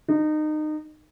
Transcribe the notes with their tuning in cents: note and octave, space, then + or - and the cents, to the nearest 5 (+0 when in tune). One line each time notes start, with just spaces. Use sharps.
D#4 -25